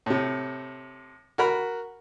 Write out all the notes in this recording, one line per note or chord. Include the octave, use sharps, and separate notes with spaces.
A2 C3
F#4 A#4 B5